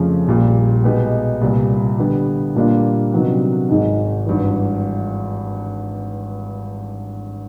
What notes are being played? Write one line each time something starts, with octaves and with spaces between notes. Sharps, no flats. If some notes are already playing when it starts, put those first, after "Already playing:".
Already playing: F2 C#3 F3 A3 C#4
A#1 A#2 G3
B2 G#3 B3 D#4 G4
C2 A#2 G3
D3 G3 B3 D4 G4
A#2 G3 A#3 D4 F4
C3 D#3 F#3 B3 D4
G#1 G#2 D#3 G#3
G#1 G2 E3